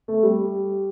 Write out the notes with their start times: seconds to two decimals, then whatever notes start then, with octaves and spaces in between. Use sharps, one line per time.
0.08 A3
0.23 G3